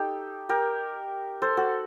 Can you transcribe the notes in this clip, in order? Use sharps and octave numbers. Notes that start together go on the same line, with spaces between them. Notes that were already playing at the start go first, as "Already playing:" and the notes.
Already playing: D#4 G4 A4
G4 A#4
A4 C5
F#4 A4